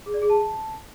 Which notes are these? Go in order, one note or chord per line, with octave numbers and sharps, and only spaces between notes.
G#4
D5
G#4
A5